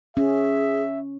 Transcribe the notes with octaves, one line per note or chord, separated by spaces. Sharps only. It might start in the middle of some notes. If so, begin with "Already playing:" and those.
C#4 G#4 E5